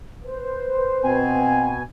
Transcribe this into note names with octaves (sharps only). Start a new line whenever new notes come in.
B4 C5
B2 C4 G#5